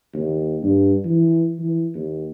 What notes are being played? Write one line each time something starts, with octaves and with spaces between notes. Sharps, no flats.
D#2
G2
E3
E3
D#2